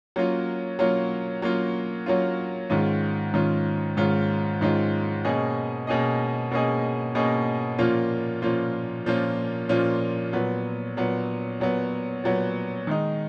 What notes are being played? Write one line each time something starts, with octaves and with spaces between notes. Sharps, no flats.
F#3 A#3 C#4 F4
F#3 A#3 C#4 F4
F#3 A#3 C#4 F4
F#3 A#3 C#4 F4
G#2 D#3 G#3 C#4 F4
G#2 D#3 G#3 C#4 F4
G#2 D#3 G#3 C#4 F4
G#2 D#3 G#3 C#4 F4
B2 A#3 C#4 G#4 D#5
B2 A#3 C#4 G#4 D#5
B2 A#3 C#4 G#4 D#5
B2 A#3 C#4 G#4 D#5
A#2 F3 A#3 C#4 F4
A#2 F3 A#3 C#4 F4
A#2 F3 A#3 C#4 F4
A#2 F3 A#3 C#4 F4
A#2 F#3 B3
A#2 F#3 B3
A#2 F#3 B3
A#2 F#3 B3
D#3 G#3 D#4